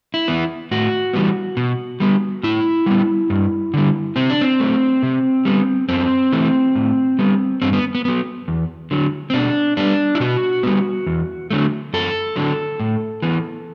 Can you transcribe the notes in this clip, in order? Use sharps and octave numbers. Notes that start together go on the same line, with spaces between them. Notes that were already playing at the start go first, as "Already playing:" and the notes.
E4
E3 B3
A2 F#4
E3 G3 B3
B2
G3 B3
A2 E4
G3 B3
G2
D3 G3
C3 C4
D4
C4
F#3 A3
C3
G3 B3
F#2 C4
E3 A3
A2
G3 B3
G2 C4
B3
B3
F#3 B3
E2
D3 F#3
C4
B2 D4
G3 B3 D4
E4
B2 F#4
G3 B3
E2
D3 F#3 A3
F#2 A4
D3 F#3
A2
E3 B3